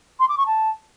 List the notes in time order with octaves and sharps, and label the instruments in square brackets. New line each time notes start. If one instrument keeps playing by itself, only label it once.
[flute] C6
D6
C#6
A5